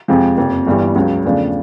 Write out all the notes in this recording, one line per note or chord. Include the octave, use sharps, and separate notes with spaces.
F2 C3 F3 G#3
F#1 F2 C3
G1 G2 E3 G3
C#2 C#3 F#3
E2 C#3 F3 A3 D4